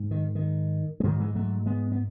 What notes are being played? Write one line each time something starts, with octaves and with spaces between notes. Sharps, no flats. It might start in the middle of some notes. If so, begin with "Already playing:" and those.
Already playing: G#2
D#3
D#3
G#3
G#2 D#3 F#3
E3 G#3
F#3 A3
G#3 B3
B3